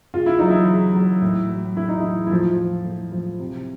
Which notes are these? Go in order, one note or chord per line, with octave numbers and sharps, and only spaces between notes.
C#3 F4
E4
F#3 D#4
E3 E4
C#3
F#3
A2
F#3
A2 E4
D#4
E3 F#3 E4
E4
A2 F3 F4
F3
A2
F3
C3